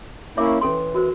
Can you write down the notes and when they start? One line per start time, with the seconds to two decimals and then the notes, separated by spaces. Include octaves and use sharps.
0.37 A#3 C#4 E4 C#5 E5 D6
0.61 E3 C#4 A4 C6
0.94 F#4 A#4 C5